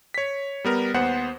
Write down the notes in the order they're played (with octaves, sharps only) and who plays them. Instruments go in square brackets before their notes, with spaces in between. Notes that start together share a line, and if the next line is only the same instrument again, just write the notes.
[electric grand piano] C#5 B6
G3 B3 A#4
D#2 B3 C5 F#5